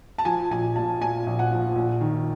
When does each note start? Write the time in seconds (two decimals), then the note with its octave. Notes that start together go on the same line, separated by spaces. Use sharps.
0.18 A5
0.25 F3 G#5
0.51 A#1 G#5
0.76 A#2 A5
1.01 A#2 G#5
1.27 A#1
1.39 F#5
1.52 F3
1.75 A#1
2.01 D#3